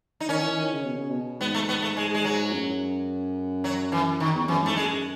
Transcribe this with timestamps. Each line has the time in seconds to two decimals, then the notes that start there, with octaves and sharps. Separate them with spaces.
0.20 D#4
0.29 D#3 C#4
0.43 E3
0.57 D#3
0.71 C#3
0.85 B2
0.97 C#3
1.10 B2
1.41 G#2 B3
1.54 A3
1.69 B3
1.82 A3
1.97 G#3
2.14 G#3
2.25 F#3
2.53 F#2
3.64 F#3
3.92 E3
4.20 D#3
4.34 E2
4.48 F#2 E3
4.62 G#2 A3
4.76 F#2 G#3